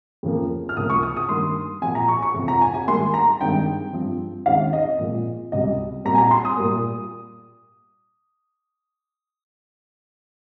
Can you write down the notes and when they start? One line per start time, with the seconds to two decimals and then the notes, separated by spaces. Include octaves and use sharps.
0.23 F2 C#3 F3 A#3
0.69 F6
0.77 C#2 C3 F3 A#3 D#6
0.90 C#6
1.03 D#6
1.17 D#6
1.29 G2 D#3 A#3 C6
1.82 A#2 F3 C4 G#5
1.95 A#5
2.08 C#6
2.22 C#6
2.34 F2 C3 F3 C4
2.48 A#5
2.61 G#5
2.74 G#5
2.87 G#2 D#3 G3 A#3 C6
3.14 A#5
3.41 G2 D#3 G#3 C4 G5
3.93 G2 F3 C4
4.46 D#2 C#3 G#3 C4 F5
4.73 D#5
4.99 A#2 F3 G#3 C4
5.52 C#2 C3 G3 D#5
6.05 A#2 G3 C4 A#5
6.15 G#5
6.18 A#5
6.31 C6
6.45 D#6
6.57 A#2 G3 A#3